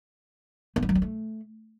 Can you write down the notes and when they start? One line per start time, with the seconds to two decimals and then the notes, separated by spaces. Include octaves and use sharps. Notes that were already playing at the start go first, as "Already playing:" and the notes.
0.76 B3
0.82 E3
0.89 F#3
0.95 C4
1.02 A3